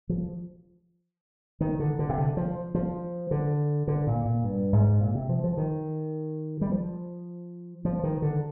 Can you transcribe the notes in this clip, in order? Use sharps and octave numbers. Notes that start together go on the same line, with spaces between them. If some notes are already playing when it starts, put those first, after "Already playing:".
F3
D#3
D3
D3
C3
D3
F3
F3
D3
D3
A#2
A#2
G2
G#2
A#2
C3
F3
F3
D#3
G3
F3
F3
D#3
D3